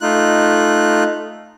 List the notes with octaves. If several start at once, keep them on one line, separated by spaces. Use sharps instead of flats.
A3 D#4 F4 F#6